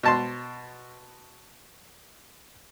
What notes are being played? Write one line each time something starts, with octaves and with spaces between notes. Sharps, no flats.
B2 A5 C6